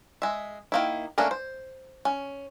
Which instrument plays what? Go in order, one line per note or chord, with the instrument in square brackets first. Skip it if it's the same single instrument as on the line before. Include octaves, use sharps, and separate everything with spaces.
[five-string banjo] G#3 E5
D#3 A#3 E4
A3 A#3 C#4 D4 A#4
C5
C#4